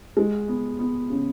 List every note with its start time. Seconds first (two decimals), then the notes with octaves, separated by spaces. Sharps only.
0.17 G#3
0.48 B3
0.79 B3
1.10 C#3